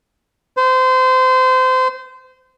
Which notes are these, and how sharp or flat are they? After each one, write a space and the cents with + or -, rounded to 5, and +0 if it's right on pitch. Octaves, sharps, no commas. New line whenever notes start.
C5 -25